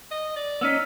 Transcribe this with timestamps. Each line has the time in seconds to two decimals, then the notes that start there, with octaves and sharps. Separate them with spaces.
0.11 D#5
0.36 D5
0.61 B3 C#4 D#4 E6 F6 B6